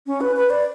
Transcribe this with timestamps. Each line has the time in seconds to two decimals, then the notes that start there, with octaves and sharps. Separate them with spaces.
0.07 C#4
0.21 B4
0.36 B4
0.50 D5